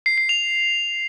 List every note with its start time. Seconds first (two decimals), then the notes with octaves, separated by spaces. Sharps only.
0.06 C7
0.18 C7
0.29 F7